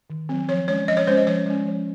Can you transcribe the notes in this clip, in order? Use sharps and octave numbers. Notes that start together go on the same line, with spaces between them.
D#3
F#3 C4
F3 C#5
G#3 C#4 C#5
F3 D#5
C#5
G#3 C#4 C5
D#5
F3 C#5
G#3 C#4
F3